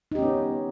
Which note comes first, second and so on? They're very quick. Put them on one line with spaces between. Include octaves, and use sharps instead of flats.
D#4 G4 C#4 B3